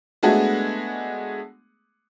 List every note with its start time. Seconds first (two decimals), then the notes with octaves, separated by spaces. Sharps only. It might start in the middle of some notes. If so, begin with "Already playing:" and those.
0.23 G#3 A3 B3 D4 F#4 G#4